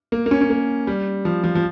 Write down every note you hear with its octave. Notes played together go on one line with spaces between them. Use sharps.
A#3
A#3
C#4
C#4
A#3
G3
F3
F3
F3